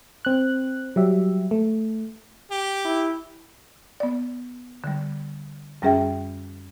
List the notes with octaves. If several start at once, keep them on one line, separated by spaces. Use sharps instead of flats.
C4 F#6
F#3 G3 G4 E5
A3
G4
E4
B3 D5
D3 G3
F#2 G3 C#4 G#4 E5 G5